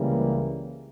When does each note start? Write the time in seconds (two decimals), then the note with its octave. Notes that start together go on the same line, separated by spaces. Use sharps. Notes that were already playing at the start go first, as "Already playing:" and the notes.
Already playing: C#2 C#3 E3 G3 A#3